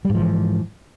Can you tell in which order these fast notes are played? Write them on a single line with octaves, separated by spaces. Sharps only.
G3 G#2 F3 E3